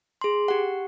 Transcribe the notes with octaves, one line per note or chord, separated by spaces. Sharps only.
G#4 C6
G4 F#5